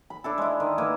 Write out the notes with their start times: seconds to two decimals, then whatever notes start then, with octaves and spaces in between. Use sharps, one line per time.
0.10 B5
0.24 D4 E4 A4
0.38 G#3 E4
0.60 D#3
0.78 A#3 E4 B4